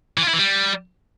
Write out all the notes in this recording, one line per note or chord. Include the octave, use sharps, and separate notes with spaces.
E3
F4
E4
E3
G3